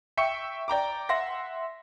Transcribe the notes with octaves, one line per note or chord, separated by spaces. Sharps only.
E5 G5 C#6 C#7
D5 G5 A#5 D6
E5 F#5 C6 A#6